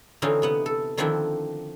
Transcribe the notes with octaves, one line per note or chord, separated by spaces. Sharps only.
D3 E3 C4 C#4 D#4 F4
C3 B3 F#5
A4
D3 D#3 F3 C4 D4 E4